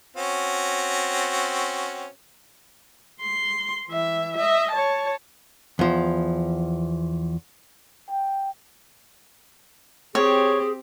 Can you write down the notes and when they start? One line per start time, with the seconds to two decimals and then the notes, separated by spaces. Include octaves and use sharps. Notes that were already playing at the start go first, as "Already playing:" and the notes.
0.16 C4 C#4 F#4
3.22 C6
3.88 E3 E5
4.36 D#5 E5
4.71 C#5 A5
5.79 E2 F3
8.10 G5
10.15 C4 G4 G#4 C#5